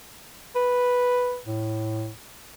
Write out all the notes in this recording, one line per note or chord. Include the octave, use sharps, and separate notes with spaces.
B4
A2